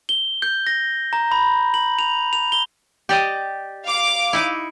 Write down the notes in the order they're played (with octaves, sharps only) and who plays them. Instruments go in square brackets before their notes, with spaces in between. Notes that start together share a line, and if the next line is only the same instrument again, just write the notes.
[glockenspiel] G7
G6
A#6
A#5
B5
F#7
F7
F7
G7
[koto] G4 D5 D#5
[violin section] F5 D6
[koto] D#4 E4